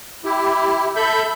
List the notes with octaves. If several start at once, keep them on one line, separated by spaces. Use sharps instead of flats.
E4 G4
A4 E5 B5 G6